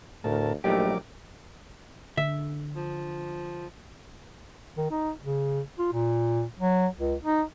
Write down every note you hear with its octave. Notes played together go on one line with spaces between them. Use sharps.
D2 A2 A#4 A5
A#1 F#3 A3 D#4 G4 A#4 D6
D3 E5
F3
D#3
D#4
C#3
F4
A#2
F#3
C#2
D#4